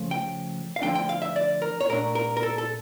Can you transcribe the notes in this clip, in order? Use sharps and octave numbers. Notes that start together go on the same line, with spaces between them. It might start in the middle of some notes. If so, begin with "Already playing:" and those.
Already playing: C#3 F3 A3
G5
F5
D3 F3 A3 D4 G5
G5
F5
E5
D5
A#4
C#5
A#2 A3 D4 A#4
A#4
A#4
A4
A4